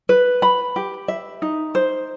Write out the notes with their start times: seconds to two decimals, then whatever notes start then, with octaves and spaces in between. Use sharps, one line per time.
0.09 B4
0.42 B5
0.76 G4
1.08 E5
1.42 D#4
1.75 C5